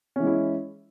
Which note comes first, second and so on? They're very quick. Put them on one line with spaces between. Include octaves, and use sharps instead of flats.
C#4 E3 G#3 E4